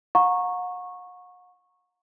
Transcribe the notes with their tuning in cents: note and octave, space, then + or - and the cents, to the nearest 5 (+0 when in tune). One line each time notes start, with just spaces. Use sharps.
F#5 -40 A#5 +0 C#6 -15